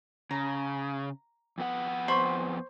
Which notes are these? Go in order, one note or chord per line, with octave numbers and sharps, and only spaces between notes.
C#3 A#5
F2 B3 F#5
C5 B5 C#6